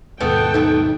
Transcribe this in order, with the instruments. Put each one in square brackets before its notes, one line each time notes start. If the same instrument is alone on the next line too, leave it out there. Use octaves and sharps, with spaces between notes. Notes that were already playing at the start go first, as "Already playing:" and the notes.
[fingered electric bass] D#2 G#2 B2 [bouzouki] A3 B3 [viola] A4 G5
[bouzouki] A3 B3 [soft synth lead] D#4